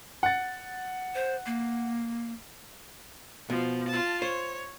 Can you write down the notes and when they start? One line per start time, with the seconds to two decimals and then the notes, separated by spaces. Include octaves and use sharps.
0.23 F#5 A6
1.15 C5
1.46 A#3
3.50 B2 F3
3.88 F4 A5
4.22 C5 C#5